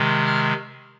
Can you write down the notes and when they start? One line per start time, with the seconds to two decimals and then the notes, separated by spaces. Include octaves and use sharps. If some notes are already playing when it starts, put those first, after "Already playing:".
Already playing: C3 D#3 G#3
0.27 F6